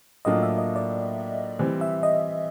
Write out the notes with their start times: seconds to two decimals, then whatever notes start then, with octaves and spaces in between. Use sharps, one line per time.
0.25 A2 F#3 A#3 D4 F4 D#5
0.43 E5
0.58 D#5
0.76 D5
1.59 E3 G3 C4
1.81 E5
2.03 D#5